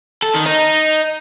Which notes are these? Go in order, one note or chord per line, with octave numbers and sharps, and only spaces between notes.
A4
D#3
D#4